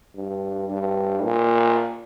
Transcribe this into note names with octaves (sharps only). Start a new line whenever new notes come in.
G2
G2
A#2